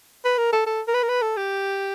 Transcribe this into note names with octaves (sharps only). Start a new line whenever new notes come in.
B4
A#4
A4
A4
A#4
B4
A#4
B4
A4
G4